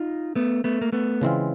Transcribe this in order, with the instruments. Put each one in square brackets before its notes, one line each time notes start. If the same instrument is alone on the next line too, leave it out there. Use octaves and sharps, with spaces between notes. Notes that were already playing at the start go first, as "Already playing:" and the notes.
Already playing: [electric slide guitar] D#4 F4
A3 B3
A3 B3
A#3
A3 B3
[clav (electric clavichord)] C#3 E3 G#3 C4 F4